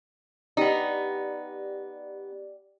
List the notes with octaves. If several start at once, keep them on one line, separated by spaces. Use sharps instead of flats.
B3 D#4 G4 D5